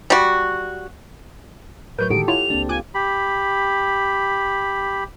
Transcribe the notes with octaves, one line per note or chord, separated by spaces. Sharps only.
G3 F#4
A2 F#3 A#4 B4 C#5 G6
A2 D3 D#3 G#3 F#4 G4 A4 D7
E4 F4 C#5 F#5 F7
C#2 A#3 C4 D4
F4 G#5 D6 F#6 D7
G4 B5